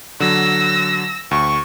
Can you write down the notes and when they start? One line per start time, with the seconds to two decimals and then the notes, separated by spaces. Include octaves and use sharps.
0.20 D3 F#3 E6 A#6
1.31 D2 C#6